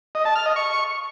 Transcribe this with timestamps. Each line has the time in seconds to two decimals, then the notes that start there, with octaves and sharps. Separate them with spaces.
0.15 D#5
0.25 A5
0.35 F6
0.46 D#5
0.56 C#6